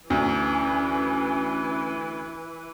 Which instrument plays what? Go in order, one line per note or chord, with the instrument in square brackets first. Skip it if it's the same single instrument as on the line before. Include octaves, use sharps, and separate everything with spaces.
[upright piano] D2 [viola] E3 B4 [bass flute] C#4